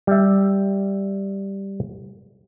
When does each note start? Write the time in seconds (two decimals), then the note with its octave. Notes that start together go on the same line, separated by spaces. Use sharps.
0.07 G3 E5